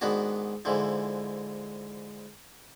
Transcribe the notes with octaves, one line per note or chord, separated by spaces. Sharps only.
G#2 D#3 B3 D4 F#4
G#2 D3 E3 F3